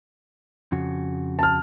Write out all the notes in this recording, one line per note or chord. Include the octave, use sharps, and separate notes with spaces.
F2 C#3 F#4
A5 F6